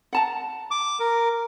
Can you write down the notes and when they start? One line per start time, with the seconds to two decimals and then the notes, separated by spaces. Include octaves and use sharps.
0.13 F#5 A5 A#5
0.71 D6
1.00 A#4